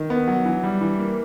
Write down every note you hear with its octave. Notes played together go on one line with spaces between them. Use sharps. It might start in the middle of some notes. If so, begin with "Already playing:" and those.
Already playing: D#3
B3
F#3
E3
G3
E3
A#3